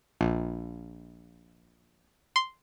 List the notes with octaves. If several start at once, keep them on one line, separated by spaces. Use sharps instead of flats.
A#1
C6